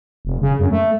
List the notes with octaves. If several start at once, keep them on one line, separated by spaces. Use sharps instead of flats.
F1
C#3
F#2
A3